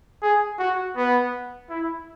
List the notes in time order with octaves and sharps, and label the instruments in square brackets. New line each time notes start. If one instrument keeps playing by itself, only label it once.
[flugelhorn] G#4
F#4
B3
E4